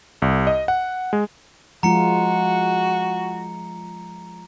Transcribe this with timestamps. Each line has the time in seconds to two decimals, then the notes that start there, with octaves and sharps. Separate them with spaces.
0.22 C2
0.47 D#5
0.68 F#5
1.13 G#3
1.83 F3 G#3 F4 F#4 A#5 C#7